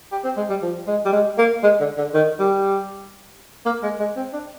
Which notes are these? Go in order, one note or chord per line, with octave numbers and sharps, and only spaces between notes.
G4
C4
G#3
G3
F3
G#3
G3
G#3
A#3
G#3
D3
D3
D#3
G3
A#3
G#3
G#3
C4
D4